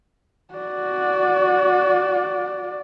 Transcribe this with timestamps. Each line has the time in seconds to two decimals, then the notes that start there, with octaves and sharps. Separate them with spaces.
0.54 F#4 D5